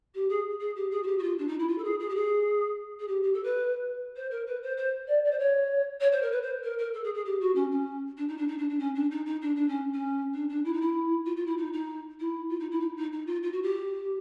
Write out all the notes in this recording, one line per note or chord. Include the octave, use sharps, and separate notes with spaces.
G4
G#4
G#4
G4
G#4
F#4
G4
F#4
F4
D4
D#4
E4
F4
A4
G#4
G#4
G4
G#4
G#4
G4
G4
A4
B4
C5
A#4
B4
C5
C5
D5
D5
C5
C#5
C#5
C5
A#4
B4
C5
A#4
A#4
A4
G#4
G#4
G4
F#4
C#4
C#4
D4
D#4
D4
D#4
D4
D4
C#4
D4
D#4
D#4
D4
D4
C#4
C#4
D4
D4
E4
D#4
E4
F4
F4
E4
D#4
D#4
E4
F4
D#4
E4
D#4
D#4
D#4
F4
F4
F#4
G4